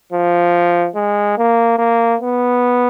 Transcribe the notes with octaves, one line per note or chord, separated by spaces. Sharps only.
F3
G#3
A#3
A#3
B3